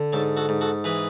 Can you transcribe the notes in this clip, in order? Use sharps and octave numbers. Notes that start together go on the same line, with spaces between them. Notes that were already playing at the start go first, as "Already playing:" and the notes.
Already playing: D3
G#2 A4 C#5
F#4 A4
G#2
F#4 A4
E3 G#4 B4